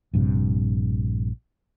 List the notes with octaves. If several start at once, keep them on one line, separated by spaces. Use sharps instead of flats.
A#1 G2 C3